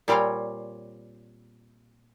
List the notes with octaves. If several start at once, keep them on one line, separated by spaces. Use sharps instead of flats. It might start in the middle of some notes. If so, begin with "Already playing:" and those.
A#2 G3 C4 C#5 F5